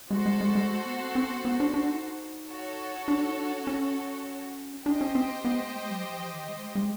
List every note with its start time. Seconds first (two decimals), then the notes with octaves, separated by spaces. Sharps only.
0.11 G#3 F#4 A4 C5
0.26 G#3
0.41 G#3
0.55 G#3
0.71 A3
0.86 B3
1.00 C4
1.15 C4
1.30 B3
1.45 B3
1.60 D4
1.74 D4
1.89 D#4
2.49 F#4 A4 C#5
3.08 D4
3.23 D#4
3.37 D4
3.52 C#4
3.67 C#4
4.85 D4 G4 C5 D#5 G5
5.01 C#4
5.15 C4
5.45 B3
5.59 A3
5.75 G#3
5.90 F#3
6.04 F3
6.19 E3
6.34 D#3
6.49 G#3
6.63 A3
6.75 G#3